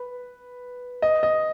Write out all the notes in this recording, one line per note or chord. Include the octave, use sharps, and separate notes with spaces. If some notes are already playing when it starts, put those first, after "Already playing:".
Already playing: B4
D#5
D#5